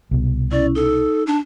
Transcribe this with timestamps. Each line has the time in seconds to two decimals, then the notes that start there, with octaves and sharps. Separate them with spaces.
0.11 C2 B2
0.52 C#4 E4 D5
0.75 D#4 A4 E6
1.27 D4